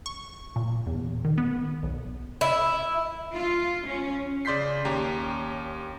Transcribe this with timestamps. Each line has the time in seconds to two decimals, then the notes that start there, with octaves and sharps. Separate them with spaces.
0.06 C#6
0.56 A#2
0.87 E2
1.25 D#3
1.38 B3
1.83 B1
2.41 E4
3.36 F4
3.88 C#4
4.45 C#3 D5 C6 G6 B6 C7
4.85 D#2 C#4 G4 A#5